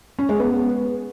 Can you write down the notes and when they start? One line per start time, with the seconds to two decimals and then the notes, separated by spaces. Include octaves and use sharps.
0.19 C#4
0.29 G#3
0.39 B3